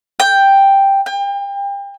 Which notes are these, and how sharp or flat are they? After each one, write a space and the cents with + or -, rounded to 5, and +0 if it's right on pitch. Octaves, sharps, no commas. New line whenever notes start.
G5 +5
G5 +35